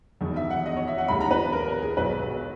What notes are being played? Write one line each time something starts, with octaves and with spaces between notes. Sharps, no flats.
E1 E2 D#3
E5
F#5
D#5
C#5
E5
F#5
D#2 D#3 G#3 B5
A#5
B4
A#4
A#4
G#4
B1 B2 G#3 B4